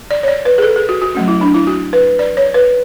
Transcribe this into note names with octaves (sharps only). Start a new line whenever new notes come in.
D5
C#5
D5
B4
G#4
A4
G#4
F#4
F#4
F#3 A3 C#4 F#4
E4
D4
E4
F#4
B4
D5
C#5
B4